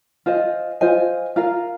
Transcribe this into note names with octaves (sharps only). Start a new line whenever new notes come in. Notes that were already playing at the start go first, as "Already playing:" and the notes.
F4 C5 D#5 G#5
F4 C5 D#5 G#5
F4 A#4 F5